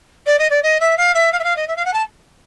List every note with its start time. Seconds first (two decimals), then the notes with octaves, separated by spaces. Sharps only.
0.26 D5
0.39 D#5
0.50 D5
0.62 D#5
0.80 E5
0.97 F5
1.14 E5
1.32 F5
1.39 E5
1.43 F5
1.56 D#5
1.67 E5
1.76 F5
1.85 F#5
1.93 A5